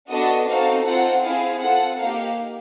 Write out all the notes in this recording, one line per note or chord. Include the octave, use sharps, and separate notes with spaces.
B3 D4 F#4 A4 D#5
C4 D#4 F#4 A4 F5
C4 F4 A4 F#5
C4 E4 G#4 F5
C4 F4 A4 F#5
A#3 D#4 G4 F5